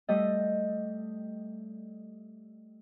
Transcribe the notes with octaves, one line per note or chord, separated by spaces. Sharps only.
G3 A3 D#5